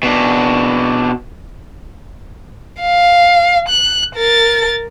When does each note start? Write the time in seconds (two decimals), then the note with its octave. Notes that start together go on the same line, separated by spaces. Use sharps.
0.03 B2 D4
2.81 F5
3.69 F#6
4.16 A#4 A6